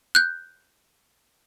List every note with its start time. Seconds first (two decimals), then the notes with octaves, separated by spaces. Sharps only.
0.15 F#6 G6